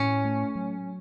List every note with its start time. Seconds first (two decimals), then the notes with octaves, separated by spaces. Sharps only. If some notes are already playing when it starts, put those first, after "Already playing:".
Already playing: A2 C#4
0.25 A3
0.55 F#3